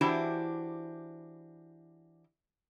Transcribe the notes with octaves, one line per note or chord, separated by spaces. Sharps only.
E3 D4 E4 F#4 G4 C5